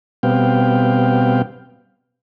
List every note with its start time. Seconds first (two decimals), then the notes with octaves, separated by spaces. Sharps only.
0.23 B2 G3 B3 C4 F5 G5